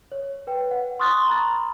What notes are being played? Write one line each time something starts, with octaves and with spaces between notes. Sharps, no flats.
C#5
B4 G5
F#5
C6 C#6 D#6 F6 F#6 A6
A#5 B5 A6